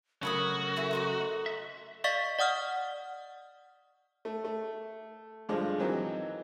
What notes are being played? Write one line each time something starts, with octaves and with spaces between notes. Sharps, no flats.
C#3 F#3 A3 F#4 A#4 C#5 B5 D#6
E4 G#4 A4 E5
D#4 C5 D#5
E5
D5 D#5 F5 C#6 A6 B6
D5 F#5 D#6 F6
A3
A3
G2 D3 F3 G#3
D#3 E3 F#3 C4 D#4